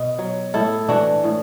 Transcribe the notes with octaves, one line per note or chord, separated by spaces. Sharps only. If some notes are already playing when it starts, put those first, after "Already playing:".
Already playing: B2
F#3
A2 E4 A4
E3 D4 F#4
A2